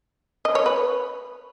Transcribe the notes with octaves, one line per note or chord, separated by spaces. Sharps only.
D#5
C#5
B4